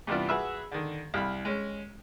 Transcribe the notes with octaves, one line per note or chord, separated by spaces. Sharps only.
G2 C3 E3 B3 D4 F4
F#4 G#4 B4 E5
D3 D#3
C2 F5 B5
G#3 C#4